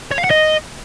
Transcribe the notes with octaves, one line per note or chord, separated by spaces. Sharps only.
C#5
F5
F#5
D#5